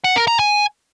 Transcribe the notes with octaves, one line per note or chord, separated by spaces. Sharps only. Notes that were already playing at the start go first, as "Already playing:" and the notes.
F#5
A#4
A#5
G#5